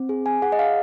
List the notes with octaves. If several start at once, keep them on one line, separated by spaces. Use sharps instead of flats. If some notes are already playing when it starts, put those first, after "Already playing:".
Already playing: C4
G#4
G#5
G#4 F#5
D#5
F5